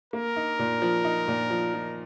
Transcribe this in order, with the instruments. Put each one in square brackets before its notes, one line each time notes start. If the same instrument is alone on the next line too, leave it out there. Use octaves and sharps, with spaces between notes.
[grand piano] A#3 [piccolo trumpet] A#4
[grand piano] D#4
A#2
F3
D#4
A#2
F3
F3